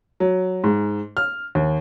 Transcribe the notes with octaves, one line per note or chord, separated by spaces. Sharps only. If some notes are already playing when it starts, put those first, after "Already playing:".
F#3
G#2
F6
D#2